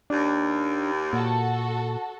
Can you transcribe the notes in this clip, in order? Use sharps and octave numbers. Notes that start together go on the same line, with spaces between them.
D#2 D4
A#2 F#4 A4